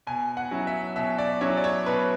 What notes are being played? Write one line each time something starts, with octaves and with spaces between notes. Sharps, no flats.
B2 G#5
F#5
F#3 C#4 E4
E5
B2 E5
D5
F#3 C#4 E4 C#5
D5
C#5
B2 B4